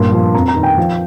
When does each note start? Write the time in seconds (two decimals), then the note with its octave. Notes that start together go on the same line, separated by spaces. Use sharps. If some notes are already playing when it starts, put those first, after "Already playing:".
Already playing: G2 A#2 C6
0.12 F3
0.34 F2 A#5
0.48 A#5
0.55 D#3
0.63 G5
0.78 F3